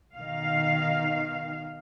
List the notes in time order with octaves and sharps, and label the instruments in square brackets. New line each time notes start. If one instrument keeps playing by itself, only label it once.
[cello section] B2 D#3 F5